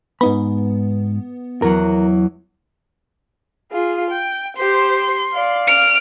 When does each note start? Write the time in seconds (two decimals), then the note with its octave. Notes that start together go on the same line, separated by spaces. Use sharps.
0.21 G#2 B3 D#4 B5
1.62 E2 F#3 F#4 A#4
3.72 F4 G#4
4.11 G5
4.57 G4 C5 C6
5.34 D5 F5
5.68 F6 D7